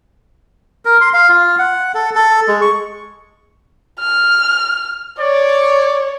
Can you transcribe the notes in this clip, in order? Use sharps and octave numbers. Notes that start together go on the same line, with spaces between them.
A#4
C6
F5
F4
F#5
A4
A4
G#3
C#6
F6
C#5 D5